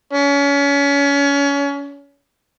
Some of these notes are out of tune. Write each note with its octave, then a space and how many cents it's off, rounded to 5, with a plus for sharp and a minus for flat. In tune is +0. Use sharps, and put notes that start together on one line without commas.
C#4 +30